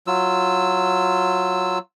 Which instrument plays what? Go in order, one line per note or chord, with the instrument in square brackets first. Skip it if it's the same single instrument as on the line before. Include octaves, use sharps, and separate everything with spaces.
[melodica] F#3 F4 E6